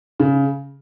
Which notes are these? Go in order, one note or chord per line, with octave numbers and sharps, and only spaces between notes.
C#3